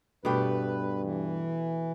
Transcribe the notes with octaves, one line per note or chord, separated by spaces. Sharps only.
G2 B2 A3 G4 B4
E3